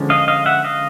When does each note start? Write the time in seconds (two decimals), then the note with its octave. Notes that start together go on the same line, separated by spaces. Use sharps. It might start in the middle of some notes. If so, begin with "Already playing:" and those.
Already playing: D3 F3 G#3 C#4
0.10 D#5 F5
0.28 D#5 F5
0.46 E5 F#5
0.64 D#5 F5